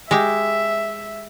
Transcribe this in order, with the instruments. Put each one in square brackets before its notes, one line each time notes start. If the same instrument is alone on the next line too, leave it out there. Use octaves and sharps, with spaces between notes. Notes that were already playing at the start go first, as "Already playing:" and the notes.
[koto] G#3 G4 [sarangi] E5